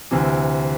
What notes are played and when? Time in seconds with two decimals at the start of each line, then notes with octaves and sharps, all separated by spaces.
0.11 D2 C3 E3